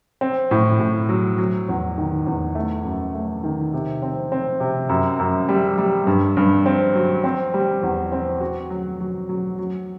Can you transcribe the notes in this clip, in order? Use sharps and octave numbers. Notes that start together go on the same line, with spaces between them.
C4
A2
A2
F#3
F#3
E2
D#3
E2
A3
F#2
A3
D#3
C3
C4
C4
C3
F#2
F#2
G3
G3
G2
G2
C4
F#3
C4
G3
E2
C4
F#4
F#3
F#3
F#3
F#3